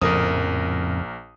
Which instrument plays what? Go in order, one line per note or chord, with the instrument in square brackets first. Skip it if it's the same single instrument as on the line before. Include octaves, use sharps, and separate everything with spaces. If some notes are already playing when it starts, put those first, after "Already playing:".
[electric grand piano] A#1 A#4 D#6 [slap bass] F2 A2 C#3